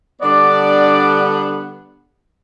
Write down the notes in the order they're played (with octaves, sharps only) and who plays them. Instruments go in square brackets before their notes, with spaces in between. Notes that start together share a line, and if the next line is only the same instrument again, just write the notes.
[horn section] D3 G3 B3 D4 D5